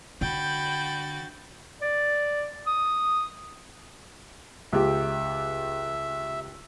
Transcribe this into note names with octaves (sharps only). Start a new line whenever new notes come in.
D3 F#4 G5 B5 G6 A6
D5
D#6
C#2 G4 E5